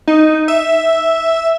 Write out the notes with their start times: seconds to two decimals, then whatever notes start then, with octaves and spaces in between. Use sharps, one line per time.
0.08 D#4
0.48 E5